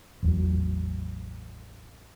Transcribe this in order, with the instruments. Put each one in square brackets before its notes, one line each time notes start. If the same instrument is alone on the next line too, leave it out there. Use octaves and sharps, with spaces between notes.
[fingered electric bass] A1 E2 F#3